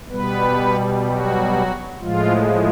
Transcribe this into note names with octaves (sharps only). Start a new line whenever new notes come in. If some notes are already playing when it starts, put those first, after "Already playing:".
B2 G3 B3 B4
F#3 F#4
A2 F3 G#3 F4